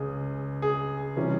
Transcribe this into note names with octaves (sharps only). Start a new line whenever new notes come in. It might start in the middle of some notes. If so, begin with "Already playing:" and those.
Already playing: C#2 C#4 G#4
G#4
C3 E3 G3 C#4